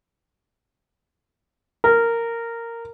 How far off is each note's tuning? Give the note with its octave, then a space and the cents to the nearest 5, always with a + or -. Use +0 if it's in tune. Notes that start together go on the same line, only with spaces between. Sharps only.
A#4 -10